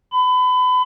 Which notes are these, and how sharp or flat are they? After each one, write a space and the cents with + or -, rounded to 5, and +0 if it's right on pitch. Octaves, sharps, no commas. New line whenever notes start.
B5 +30